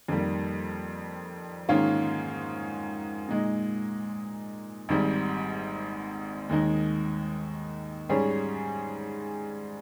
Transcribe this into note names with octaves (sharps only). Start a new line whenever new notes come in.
F2 D#3 G3 A#3
G#2 D#3 A#3 C#4 F4
A#2 G#3 D#4
G#1 G#2 G3
D#2 D#3 G#3 D#4
G#2 G3 C#4 G#4 C#5